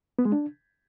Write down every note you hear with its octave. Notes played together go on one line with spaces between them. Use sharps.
B3
G#3
D4